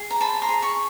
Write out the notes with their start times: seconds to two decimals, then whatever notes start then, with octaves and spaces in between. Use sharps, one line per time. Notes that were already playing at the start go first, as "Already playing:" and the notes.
Already playing: G#4
0.10 A#5
0.21 C5 A5 B5
0.42 A#5 C6
0.49 G#4
0.62 B5 C#6